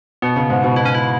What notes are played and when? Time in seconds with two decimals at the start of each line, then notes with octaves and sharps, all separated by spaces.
0.22 B2 B3
0.36 C#3
0.50 G#2
0.64 B2
0.76 B2 E4
0.85 C#4
0.95 E4